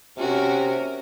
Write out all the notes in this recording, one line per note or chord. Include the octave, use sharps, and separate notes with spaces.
C3 C#4 F#4 A#4